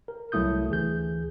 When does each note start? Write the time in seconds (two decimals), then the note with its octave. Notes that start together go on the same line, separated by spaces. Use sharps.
0.08 A#4
0.32 C2 F#3 A3 E4 D#6 G6
0.69 D2 E3 G#4 G6